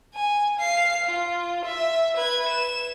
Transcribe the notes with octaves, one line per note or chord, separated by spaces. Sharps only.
G#5
F5 C7
F4
E5
B4 G#6
E7